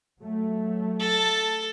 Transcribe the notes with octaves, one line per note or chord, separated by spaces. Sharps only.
F#3 A3
A4 A5